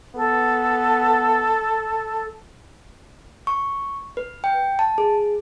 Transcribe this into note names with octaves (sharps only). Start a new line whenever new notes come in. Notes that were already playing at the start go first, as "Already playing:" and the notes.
B3 A4
C#6
B4
G5
A5
G#4